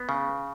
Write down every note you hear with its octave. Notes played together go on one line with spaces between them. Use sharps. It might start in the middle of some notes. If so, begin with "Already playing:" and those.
Already playing: B3
C#3